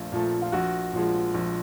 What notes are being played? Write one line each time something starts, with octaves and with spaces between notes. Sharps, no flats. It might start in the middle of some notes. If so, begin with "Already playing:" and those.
Already playing: A#1 A#2 F3 A3 F4
A#2 F3 A3
F4
A#1 F#4
A#2 F3 G#3
A#1